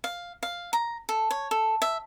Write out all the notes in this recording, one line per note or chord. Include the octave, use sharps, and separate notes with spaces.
F5
F5
A#5
A4
C#5
A4
E5